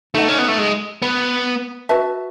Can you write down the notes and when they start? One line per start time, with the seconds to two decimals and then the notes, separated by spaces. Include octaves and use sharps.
0.14 A3 D#4 A4 D#5 F#5
0.29 C#4
0.38 B3
0.48 A3
0.59 G#3
1.02 B3
1.89 F#4 B4 E5 A5